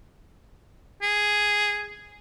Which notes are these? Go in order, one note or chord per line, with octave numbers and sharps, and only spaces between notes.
G#4